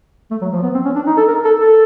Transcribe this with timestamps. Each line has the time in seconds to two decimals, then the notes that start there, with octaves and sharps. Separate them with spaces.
0.31 A3
0.41 F#3
0.53 F3
0.63 B3
0.74 C4
0.85 C#4
0.96 D4
1.07 D#4
1.17 A4
1.28 A#4
1.45 A4
1.61 A4